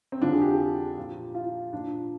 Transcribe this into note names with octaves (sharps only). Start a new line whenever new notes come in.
C4
F2 D3 F3 D4
G#4
G4
G#4
G4
A#2 F3
F4
A#2 F3 D4